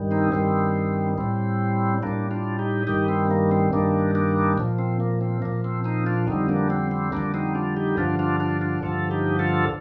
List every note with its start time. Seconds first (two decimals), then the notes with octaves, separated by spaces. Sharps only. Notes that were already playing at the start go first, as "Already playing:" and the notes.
Already playing: G2 D#3 G3
0.11 C4 D#4
0.32 G2 D#3 G3 C4
1.18 A2 G3 C4
2.02 A2 G3 A#3 D4
2.31 D4 F4
2.59 D#4 G4
2.87 G2 D#3 G3 D#4 G4
3.08 C4
3.31 A#3
3.51 C4
3.73 G2 D#3 G3 A#3 D4
4.15 A#3 D4
4.58 A#2 F3
4.79 C4
5.00 A#3
5.21 C4
5.42 A#2 F3 A#3
5.64 C4
5.85 C4 D#4
6.06 D4 F4
6.27 F2 D3 G3 C4 D#4
6.49 A#3 D4
6.70 C4
6.91 C4
7.12 F2 D3 G3 A#3 D4
7.34 C4 D#4
7.55 D4 F4
7.76 D#4 G4
7.97 G2 D3 F3 D4 F4
8.19 D4 F4
8.40 D4 F4
8.61 D4 F4
8.82 G2 D3 F3 F4 A4
9.11 D#4 G4
9.39 F4 A4